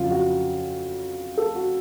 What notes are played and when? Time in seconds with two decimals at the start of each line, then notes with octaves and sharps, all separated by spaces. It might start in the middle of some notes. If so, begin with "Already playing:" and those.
Already playing: F2 C#3 F#3 F4
0.11 F#4
1.38 A4
1.55 F#4